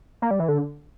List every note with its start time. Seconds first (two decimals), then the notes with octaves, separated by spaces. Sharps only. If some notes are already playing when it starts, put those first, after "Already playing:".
0.22 A#3
0.31 G3
0.39 E3
0.48 D3